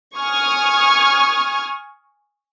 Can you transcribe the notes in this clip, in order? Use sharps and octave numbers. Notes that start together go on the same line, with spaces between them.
G#5 C#6 D#6 F6 G#6